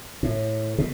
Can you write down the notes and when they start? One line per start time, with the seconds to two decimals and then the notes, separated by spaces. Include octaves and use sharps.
0.23 A2
0.78 B2